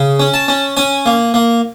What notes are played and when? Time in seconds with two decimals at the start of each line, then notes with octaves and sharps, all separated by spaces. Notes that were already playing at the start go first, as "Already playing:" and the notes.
Already playing: C#3
0.20 C#4
0.34 A5
0.48 C#4
0.77 C#4 G#5
1.06 A#3
1.34 A#3